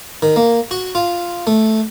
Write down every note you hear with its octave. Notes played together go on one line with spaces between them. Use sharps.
D#3
A#3
F#4
F4
A3